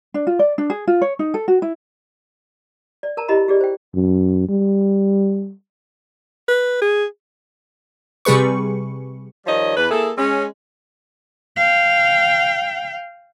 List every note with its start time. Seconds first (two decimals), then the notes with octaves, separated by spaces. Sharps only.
0.14 D4
0.27 F4
0.39 D5
0.58 D4
0.70 G#4
0.88 F4
1.02 C#5
1.19 D#4
1.34 A4
1.48 F#4
1.62 E4
3.03 D5
3.17 A#4 A5 A#5
3.28 E4 G4 D#5 A#5 B5
3.48 G4 G#4 D5
3.61 C5 G5
3.95 F#2
4.49 G3
6.48 B4
6.82 G#4
8.25 C3 G3 G#4 B4 C#6
9.46 D#3 F3 G3 C#5 D#5
9.76 E2 B4
9.90 A#3 E4 G#4 A4
10.17 G#3 C#4
11.56 F5 G5